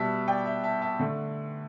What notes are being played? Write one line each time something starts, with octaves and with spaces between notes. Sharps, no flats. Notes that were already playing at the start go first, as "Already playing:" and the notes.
Already playing: B2 G3 E5 A5
D5 G5
E5
E5 A5
E5 A5
D3 A3